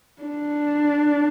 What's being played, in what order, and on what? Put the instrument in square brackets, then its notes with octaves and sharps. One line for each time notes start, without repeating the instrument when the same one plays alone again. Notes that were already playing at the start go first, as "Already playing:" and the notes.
[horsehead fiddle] D4